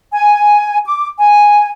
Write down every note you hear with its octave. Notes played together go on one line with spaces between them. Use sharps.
G#5
D6
G#5